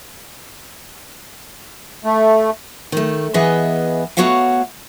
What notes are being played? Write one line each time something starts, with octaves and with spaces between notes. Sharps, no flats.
A3
D#3 A3
E3 B3 G#4 B4 D#5 E5
A3 B3 F#4 C#5 F5 F#5